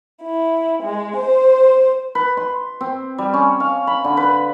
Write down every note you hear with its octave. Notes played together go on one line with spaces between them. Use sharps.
E4
G#3
C5
B4
C6
C4
G3
C#4
F5
B5
D3
B4